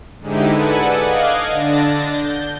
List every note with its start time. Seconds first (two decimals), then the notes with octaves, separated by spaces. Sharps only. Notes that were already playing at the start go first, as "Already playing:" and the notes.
0.20 G#2 D3 G#3 D#4 E4 G4
0.51 A4 B4 D5 F#5 G#5
1.00 D#5 F5 D6 F#6 G#6
1.49 D3 D4 A6 A#6
2.10 G6